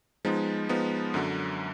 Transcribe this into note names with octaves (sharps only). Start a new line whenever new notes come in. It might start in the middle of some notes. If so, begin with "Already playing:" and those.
F3 G#3 B3 D#4
F3 G#3 B3 D#4
F#2 D3 F#3